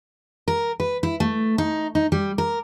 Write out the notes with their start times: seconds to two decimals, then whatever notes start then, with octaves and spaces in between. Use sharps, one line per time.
0.48 A#4
0.80 B4
1.03 E4
1.20 A3
1.58 D#4
1.95 D#4
2.12 G3
2.38 A#4